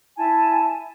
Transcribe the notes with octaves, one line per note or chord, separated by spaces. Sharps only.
E4 G#5 A5